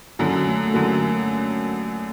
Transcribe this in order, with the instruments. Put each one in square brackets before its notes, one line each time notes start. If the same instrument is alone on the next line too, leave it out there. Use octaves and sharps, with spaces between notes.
[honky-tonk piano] F#2 D3 F#3 [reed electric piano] A#3
[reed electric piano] A3
A3
[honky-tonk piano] F#2 D3 F#3 [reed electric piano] A#3